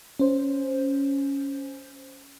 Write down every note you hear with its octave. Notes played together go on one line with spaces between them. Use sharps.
C#4 C5